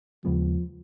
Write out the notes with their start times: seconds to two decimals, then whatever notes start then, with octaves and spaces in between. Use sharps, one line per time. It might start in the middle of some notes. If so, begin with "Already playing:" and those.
0.25 D#2 C#3 F3 G#3 B3